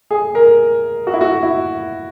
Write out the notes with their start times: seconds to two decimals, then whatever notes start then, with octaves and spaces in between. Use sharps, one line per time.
0.11 G#4
0.35 A#4
1.07 F#4
1.14 E4
1.21 F#4
1.43 E4